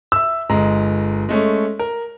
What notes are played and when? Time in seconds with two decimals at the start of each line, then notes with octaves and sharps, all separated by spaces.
0.12 E5 E6
0.50 G1 G#3 A#5
1.29 G#3 A3 C#4
1.79 A#4